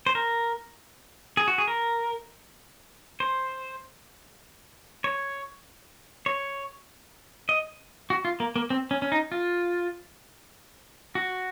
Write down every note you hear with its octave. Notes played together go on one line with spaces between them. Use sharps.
C5
A#4
G#4
F#4
G#4
A#4
C5
C#5
C#5
D#5
F#4
F4
A#3
A#3
C4
C#4
C#4
D#4
F4
F#4